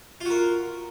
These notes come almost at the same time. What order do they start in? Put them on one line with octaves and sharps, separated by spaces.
F4 F#4 A#4